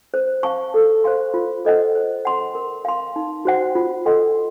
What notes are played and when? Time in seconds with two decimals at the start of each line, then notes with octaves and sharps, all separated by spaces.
0.14 C5
0.43 F5 A5 C#6
0.74 A4
1.04 C5 F5 C6
1.34 F4
1.65 A4 C5 D#5 F#5
1.95 C5
2.25 F#5 C6
2.55 A#4
2.85 F5 C6
3.16 D#4
3.45 F#4 C5 F#5
3.75 F4
4.05 A4 D#5 F#5 C6